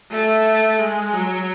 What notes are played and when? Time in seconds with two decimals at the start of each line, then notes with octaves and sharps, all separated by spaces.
0.11 A3
0.79 G#3
1.13 F#3